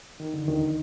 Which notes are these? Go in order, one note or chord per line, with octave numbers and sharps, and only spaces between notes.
D#3
D3
D#2 D#3